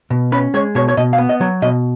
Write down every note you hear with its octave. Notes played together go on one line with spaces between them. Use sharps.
B2
C#4 B4
G#3 C#5
B2 C#5
C#5
B2 D#5
F5
B3
D#5
F#3
B2 D#5